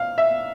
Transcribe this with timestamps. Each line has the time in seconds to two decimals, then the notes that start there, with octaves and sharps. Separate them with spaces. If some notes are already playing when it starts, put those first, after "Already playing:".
Already playing: F5
0.18 E5